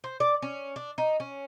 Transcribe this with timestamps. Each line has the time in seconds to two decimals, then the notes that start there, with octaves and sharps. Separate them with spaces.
0.04 C5
0.20 D5
0.42 C#4
0.76 D4
0.98 D#4
1.20 C#4